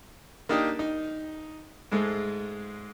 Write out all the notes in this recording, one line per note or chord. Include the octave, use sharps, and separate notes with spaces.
A#3 D4 D#4 G4 D#6
D#4
G#2 G#3 A3